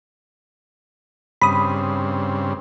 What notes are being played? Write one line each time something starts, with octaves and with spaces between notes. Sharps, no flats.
G2 C#3 C4 B5 D#6